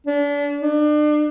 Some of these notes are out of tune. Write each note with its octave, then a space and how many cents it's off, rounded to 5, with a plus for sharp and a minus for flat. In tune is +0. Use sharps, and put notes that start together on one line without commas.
D4 -35
D4 +35